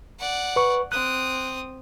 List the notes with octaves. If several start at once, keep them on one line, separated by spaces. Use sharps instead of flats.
D5 F#5
B4 C#6
C4 D#6 F#6